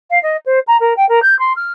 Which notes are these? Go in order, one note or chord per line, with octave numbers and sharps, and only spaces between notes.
F5
D#5
C5
A#5
A#4
G5
A#4
G6
C6
F6